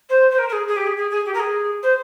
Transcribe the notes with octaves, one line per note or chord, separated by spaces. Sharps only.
C5
C5
A#4
A#4
G#4
G#4
G4
G#4
G#4
G#4
G4
A#4
G#4
C5